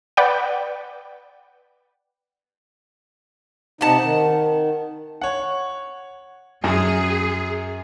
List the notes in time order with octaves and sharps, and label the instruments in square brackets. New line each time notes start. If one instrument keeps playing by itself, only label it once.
[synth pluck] B4 D5 F#5 G5
[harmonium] C3 D#4 [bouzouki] F#5 A5
[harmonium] D#3
[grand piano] C#5 F#5
[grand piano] F#2 [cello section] G#4